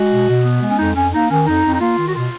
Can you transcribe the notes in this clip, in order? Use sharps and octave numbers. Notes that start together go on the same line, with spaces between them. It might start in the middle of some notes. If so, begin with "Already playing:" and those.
Already playing: G#3 F#4
B2
B2
B3
G#3
C#4
F2 D#4
F2 C#4
A#3 D#4
D#3 C#4
F2 D#4
F2
D#4
A#3 F4
D#3
F#4
B2 F4